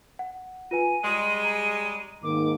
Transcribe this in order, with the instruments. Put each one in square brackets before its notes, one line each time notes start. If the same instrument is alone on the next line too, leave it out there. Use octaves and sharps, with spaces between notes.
[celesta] F#5
[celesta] F4 B4 G#5 [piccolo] D#7
[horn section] G3 G#3 [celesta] C6
[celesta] A#5
[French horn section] G#2 D#3 A#3 [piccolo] D6